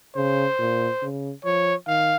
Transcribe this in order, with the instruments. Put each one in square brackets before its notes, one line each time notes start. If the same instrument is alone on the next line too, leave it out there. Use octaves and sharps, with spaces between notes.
[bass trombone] C#3 [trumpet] C5
[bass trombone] A#2
C#3
[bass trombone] F3 [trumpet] C#5
[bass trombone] D#3 [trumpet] F5